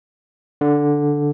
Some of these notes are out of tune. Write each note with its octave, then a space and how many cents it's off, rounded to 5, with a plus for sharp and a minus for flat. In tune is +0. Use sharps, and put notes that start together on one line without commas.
D3 -5